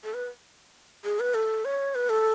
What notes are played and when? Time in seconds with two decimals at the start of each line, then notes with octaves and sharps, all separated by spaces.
0.04 A4
0.14 B4
1.04 G#4
1.20 B4
1.34 A4
1.65 C#5
1.95 B4
2.09 A4